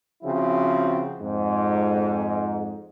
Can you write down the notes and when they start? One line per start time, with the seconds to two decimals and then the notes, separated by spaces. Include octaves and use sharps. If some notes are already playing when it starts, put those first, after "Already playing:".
0.23 C#3 F3 C4 E4 F#4
1.20 F2 G#2